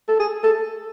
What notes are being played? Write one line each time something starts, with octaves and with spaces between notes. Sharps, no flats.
A4
G#4
A4